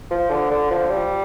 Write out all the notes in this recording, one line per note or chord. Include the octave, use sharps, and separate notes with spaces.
F3
D3
D3
F3
G3